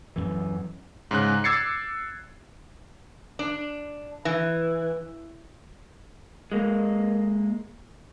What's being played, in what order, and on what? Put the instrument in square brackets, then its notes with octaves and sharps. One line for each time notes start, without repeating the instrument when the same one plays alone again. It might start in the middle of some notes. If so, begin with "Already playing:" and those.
[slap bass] F#2 E3
[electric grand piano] G#2 C#3 F#6
D6 E6 G#6 A6 C7 C#7
[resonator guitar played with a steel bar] D4
E3
[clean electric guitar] G#3 A#3